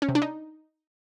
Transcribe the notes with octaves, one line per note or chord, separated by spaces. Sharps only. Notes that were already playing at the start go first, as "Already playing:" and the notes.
C#4
C3
D4
D#4